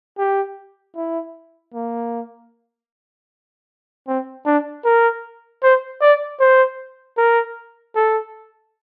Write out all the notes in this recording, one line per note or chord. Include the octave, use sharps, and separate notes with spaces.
G4
E4
A#3
C4
D4
A#4
C5
D5
C5
A#4
A4